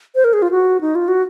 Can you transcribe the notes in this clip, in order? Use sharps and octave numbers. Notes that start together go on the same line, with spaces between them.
C5
A#4
G#4
F4
F#4
D#4
F4
F#4